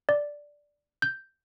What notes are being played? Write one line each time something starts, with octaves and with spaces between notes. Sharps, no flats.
D5
G6